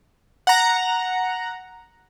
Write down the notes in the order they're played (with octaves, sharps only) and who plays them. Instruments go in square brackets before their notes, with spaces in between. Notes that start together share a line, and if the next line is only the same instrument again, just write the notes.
[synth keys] F#5 A#5